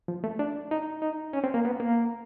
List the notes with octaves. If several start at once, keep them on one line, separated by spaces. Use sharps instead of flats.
F3
A3
D4
D#4
D#4
C#4
C4
A#3
B3
A#3